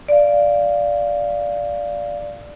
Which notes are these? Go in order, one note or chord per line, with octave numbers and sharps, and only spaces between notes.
D5 F5